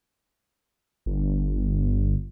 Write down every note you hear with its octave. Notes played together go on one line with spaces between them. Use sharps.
G1